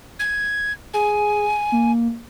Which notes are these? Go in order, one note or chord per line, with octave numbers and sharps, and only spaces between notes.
G#6
G#4 G#5
A#3